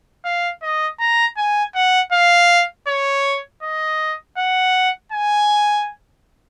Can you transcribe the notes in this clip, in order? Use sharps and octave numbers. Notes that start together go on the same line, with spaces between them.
F5
D#5
A#5
G#5
F#5
F5
C#5
D#5
F#5
G#5